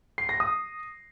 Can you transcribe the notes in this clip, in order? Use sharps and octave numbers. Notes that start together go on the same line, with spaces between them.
C7
A#6
D#6